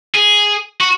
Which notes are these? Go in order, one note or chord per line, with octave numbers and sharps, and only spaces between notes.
G#4
F#4